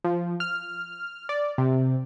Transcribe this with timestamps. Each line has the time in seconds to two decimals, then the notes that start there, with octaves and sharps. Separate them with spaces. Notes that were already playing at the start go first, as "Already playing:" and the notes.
0.04 F3
0.40 F6
1.29 D5
1.58 C3